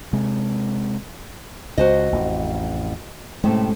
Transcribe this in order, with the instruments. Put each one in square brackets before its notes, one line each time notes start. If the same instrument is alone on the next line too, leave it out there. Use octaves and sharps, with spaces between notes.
[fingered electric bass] C3 G#3
[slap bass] C#2 [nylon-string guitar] F#4 C5 D#5
[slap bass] A1 F2
[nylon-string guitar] A2 C3 A3 [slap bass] G#3 C#4